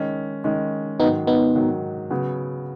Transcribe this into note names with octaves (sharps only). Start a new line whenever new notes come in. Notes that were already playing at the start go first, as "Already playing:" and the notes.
Already playing: D#3 G#3 C#4
D#3 G#3 C#4
G#2 D#3 F#3 B3 D#4
B3 D#4
G#2 D#3 F#3
C#3 F#3 B3